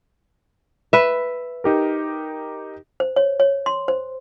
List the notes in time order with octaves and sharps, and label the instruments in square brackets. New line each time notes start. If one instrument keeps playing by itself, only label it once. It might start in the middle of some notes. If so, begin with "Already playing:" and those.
[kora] B4 E5
[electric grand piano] D#4 G4 A#4
[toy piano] C5
C#5
C#5
C6
C5